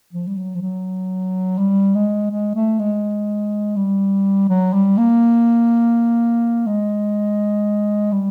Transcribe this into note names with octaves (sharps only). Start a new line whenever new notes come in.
F3
G3
F#3
F3
F#3
G3
G#3
G#3
A3
G#3
G3
F#3
G3
A#3
G#3
G3